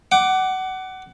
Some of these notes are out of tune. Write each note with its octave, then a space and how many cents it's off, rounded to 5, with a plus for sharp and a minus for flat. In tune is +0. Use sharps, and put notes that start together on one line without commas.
F#5 +25 D6 +0